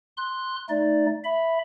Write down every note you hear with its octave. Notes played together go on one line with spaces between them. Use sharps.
C6 F#6
A3 D#4 D5
E5 B5